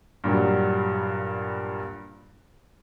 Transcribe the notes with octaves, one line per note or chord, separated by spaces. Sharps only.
G2 A#2 F#3 G3